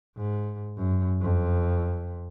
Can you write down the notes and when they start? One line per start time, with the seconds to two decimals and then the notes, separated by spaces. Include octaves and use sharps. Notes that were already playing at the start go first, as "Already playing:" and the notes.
0.17 G#2
0.77 F#2
1.22 F2